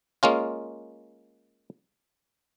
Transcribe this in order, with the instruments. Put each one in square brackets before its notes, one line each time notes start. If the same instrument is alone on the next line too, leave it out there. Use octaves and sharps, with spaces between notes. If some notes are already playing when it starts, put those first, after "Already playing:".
[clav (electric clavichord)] G#3 A#3 C#4 F4